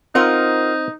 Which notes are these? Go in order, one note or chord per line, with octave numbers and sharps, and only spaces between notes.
C4 D#4 F4 A#4 F#5